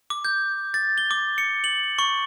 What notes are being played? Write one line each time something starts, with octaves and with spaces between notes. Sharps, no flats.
D6
G6
A6
G7
D6
C#7
F#7
C#6